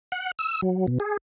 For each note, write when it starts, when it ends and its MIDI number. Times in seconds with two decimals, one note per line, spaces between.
0.12 0.31 78
0.39 0.61 88
0.62 0.86 54
0.87 0.98 47
1.00 1.17 68